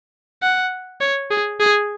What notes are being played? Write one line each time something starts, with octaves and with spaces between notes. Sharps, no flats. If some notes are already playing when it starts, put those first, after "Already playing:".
F#5
C#5
G#4
G#4